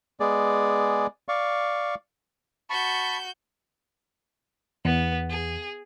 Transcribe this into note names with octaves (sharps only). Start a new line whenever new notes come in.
G#3 B3 G#4 D5
D5 F5 C#6
F#4 A5 B5 C#6 G6
E2 B3
G#4